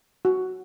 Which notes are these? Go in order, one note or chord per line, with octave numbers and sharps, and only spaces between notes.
F#4